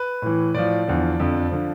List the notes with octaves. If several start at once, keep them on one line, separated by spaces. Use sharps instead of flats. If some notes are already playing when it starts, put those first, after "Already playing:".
Already playing: B4
A2 E3
A2 F3 D5
E2 D3 F3
F2 D3 F3
D3 F3